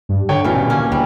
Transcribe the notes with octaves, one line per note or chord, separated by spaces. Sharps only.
G2
D3 C#5 G5
D#1 B2 E3 A#3 C#4
A#3 C#4
D2 G3